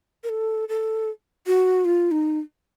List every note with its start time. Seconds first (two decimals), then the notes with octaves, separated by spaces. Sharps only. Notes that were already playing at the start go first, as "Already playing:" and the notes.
0.24 A#4
0.29 A4
0.69 A4
1.47 F#4
1.85 F4
2.11 D#4